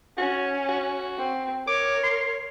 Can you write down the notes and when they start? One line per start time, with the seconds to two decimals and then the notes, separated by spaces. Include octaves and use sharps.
0.18 C#4 F#4
0.69 F#4
1.19 C4
1.67 A#4 C#5 D6
2.03 C6